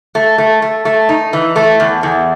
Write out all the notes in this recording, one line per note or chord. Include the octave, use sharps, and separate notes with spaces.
A3
A3
A3
A3
D#4
E3
A3
E2
E2